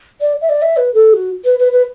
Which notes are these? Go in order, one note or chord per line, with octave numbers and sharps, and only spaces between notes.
D5
E5
D5
E5
B4
A4
F#4
B4
B4
B4